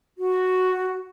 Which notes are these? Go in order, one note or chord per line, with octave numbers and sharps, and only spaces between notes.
F#4